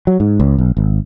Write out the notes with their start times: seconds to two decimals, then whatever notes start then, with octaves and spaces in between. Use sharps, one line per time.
0.07 F#3
0.20 G#2
0.40 C#2
0.58 B1
0.77 G#1